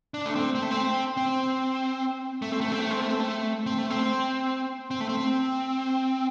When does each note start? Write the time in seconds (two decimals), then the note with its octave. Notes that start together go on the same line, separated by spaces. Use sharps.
0.14 D4
0.26 A3
0.35 C4
0.55 C4
0.62 A3
0.71 C4
1.17 C4
2.42 A3
2.52 C4
2.61 A3
2.72 C4
2.80 A3
2.91 C4
3.01 A3
3.11 C4
3.20 A3
3.66 C4
3.78 A3
3.91 C4
4.91 C4
5.00 A3
5.09 C4